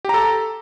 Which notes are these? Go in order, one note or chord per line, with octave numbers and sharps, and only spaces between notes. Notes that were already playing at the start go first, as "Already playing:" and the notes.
G4 A4 A#5